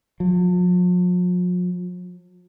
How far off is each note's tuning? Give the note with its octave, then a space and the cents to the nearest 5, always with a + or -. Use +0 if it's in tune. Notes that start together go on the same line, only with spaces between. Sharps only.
F3 +45